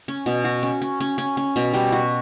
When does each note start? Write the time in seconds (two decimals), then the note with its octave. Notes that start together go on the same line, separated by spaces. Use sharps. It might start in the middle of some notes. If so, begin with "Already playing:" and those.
0.08 C#4
0.26 B2
0.44 F#4
0.63 C#4
0.82 C#4
1.00 C#4
1.18 C#4
1.37 C#4
1.56 B2
1.73 G3
1.92 F#4